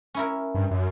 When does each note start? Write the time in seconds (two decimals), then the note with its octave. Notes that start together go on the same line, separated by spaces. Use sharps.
0.14 C#4 E4 A#4
0.55 G2
0.71 F#2